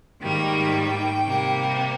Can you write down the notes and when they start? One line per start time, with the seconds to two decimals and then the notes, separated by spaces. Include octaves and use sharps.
0.21 G#2 D#3 G3 A#3 G5
1.25 C3 G3 A#3